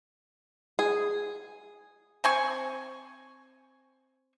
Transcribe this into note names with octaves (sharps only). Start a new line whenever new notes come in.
G#4
C4 G#5 C#6